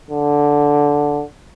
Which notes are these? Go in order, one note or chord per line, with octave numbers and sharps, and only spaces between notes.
D3